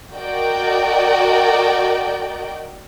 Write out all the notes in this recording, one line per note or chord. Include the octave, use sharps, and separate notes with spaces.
F#4 A#4 D5 D#5 G5